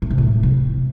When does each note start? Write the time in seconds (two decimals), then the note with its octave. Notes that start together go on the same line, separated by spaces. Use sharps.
0.02 A2
0.10 C3
0.18 A2
0.43 C3